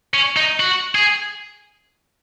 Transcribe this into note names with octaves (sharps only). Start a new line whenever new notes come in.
C#4
D#4
F#4
G#4